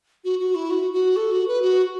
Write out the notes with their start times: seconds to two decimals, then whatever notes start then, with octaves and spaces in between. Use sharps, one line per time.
0.24 F#4
0.39 F#4
0.55 E4
0.70 F#4
0.93 F#4
1.17 A4
1.32 F#4
1.48 B4
1.62 F#4